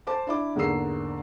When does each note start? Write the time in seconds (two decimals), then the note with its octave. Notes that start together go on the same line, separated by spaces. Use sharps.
0.07 C5 A5 D6
0.27 D4 E4 D6
0.55 E2 G#2 D3 A#3 E6 C7